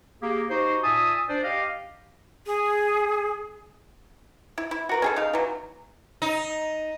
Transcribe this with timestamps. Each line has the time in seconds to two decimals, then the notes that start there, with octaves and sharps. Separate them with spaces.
0.22 A#3 G4 G#4
0.50 D#4 F#4 G4 C5
0.83 A#2 E5 G#5 A5 D#6
1.28 D4 C5 D5
1.43 G4 D#5 F5
2.46 G#4
4.58 E4
4.71 E4
4.89 F#4 A#4 B4
5.02 C#4 G#4 A4
5.16 C#3 D#4 F5
5.33 E3 F#3
6.22 D#4